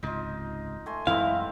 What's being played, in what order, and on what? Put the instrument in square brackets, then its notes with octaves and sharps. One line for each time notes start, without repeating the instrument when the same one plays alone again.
[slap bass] C#2 G#2 C3 [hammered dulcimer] D#4 F4
[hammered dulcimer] A3 G#5 C6
[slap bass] F#2 E3 G#3 [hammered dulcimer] A2 B3 C4 [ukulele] E4 [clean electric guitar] F5